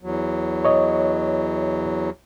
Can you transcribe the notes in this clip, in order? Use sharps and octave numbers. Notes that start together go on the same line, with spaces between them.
E2 F#3
C#5 D#5